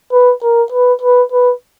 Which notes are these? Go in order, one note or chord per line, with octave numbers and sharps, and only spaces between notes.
B4
A#4
B4
B4
B4